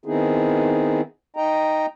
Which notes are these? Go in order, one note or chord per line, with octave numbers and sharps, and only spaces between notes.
D#3 B3 C4 D#4 E4 G#4
D#4 D#5 G5 A#5